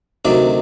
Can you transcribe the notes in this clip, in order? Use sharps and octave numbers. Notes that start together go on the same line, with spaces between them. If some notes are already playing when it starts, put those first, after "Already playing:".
D2 C3 D#3 F#3 D5